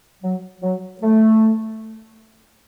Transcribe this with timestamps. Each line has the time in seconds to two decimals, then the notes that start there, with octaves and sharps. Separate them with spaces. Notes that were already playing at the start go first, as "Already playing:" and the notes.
0.23 F#3
0.62 F#3
1.02 A3